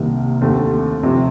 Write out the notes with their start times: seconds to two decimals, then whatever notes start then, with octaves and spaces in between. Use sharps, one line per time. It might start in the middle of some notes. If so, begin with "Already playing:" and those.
Already playing: C2 C3 D#3 A#3
0.41 D#2 D3 A3 C4
1.03 C3 F3 C4